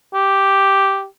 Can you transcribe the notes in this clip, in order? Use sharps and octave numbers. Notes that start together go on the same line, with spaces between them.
G4